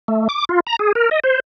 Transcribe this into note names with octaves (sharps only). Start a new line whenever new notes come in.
A3
D6
F4
A#5
G#4
A#4
D#5
C5